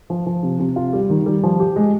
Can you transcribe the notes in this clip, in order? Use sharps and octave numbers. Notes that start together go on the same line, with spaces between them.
F3
F3
C3
C3
F4
G3
D#3
G3
F3
G4
G#3